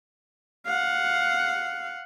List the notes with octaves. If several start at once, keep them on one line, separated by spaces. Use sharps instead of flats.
F5 F#5